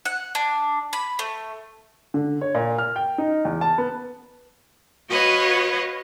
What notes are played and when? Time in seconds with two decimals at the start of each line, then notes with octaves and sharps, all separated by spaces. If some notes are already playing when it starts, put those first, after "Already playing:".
0.05 F#5
0.35 D4
0.93 B5
1.19 A3
2.14 D3
2.41 C#5
2.55 A#2
2.78 F6
2.96 G5
3.18 D#4
3.45 E2
3.61 A5
3.78 B3
5.09 F#4 B4 C#5 D#5 F5